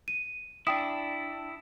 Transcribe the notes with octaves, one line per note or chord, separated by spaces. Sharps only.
D#7
D4 E4 G5 D#6